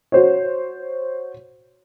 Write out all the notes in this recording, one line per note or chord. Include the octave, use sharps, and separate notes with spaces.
F#4 C5 C#5